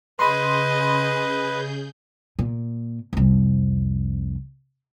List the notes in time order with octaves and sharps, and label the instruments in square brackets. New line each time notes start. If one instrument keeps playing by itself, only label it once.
[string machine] C#3 G#4 G6 [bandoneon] B4 [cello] D#5 [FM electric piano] B5 C6
[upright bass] A#2
C2 F2